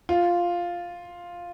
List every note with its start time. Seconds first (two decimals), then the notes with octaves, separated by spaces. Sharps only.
0.09 F4